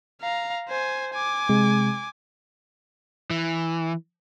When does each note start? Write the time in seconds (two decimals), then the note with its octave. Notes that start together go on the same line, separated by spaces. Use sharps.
0.21 F5 A#5
0.69 C5 G#5
1.13 G#5 D6
1.49 C3 G#3
3.30 E3